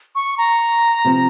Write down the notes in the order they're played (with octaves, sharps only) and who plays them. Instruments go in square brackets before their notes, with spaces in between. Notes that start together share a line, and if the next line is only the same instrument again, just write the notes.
[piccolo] C#6
A#5
[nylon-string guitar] C3 F3 C4